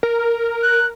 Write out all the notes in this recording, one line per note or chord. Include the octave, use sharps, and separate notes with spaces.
A#4
F#6